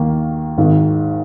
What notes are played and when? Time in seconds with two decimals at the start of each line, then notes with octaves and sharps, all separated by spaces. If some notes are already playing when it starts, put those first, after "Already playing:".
Already playing: D#2 D#3 A#3
0.58 G#1 G#2 D#3